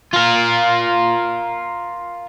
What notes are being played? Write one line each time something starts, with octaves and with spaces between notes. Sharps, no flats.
F4 A#4